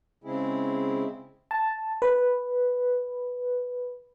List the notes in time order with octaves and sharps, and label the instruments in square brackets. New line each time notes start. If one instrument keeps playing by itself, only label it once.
[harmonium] C#3 G#3 C4 E4 G#4
[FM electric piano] A5
B4